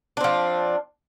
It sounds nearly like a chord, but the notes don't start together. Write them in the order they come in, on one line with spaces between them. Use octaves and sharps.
D4 C4 F3